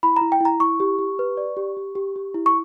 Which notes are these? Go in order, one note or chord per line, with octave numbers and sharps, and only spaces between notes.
E4 B5
E4 A#5
G5
E4 A#5
E4 C#6
G4
G4
B4
D5
G4
G4
G4
G4
E4
C#6